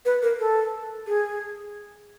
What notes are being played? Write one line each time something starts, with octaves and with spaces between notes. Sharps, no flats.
B4
A#4
A4
G#4